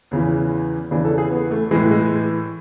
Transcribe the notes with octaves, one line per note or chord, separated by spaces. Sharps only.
E2 C#3 E3
E2 C#3 E3 D4
A4
G#4
B3
A3
A2 E3 G#3
G#3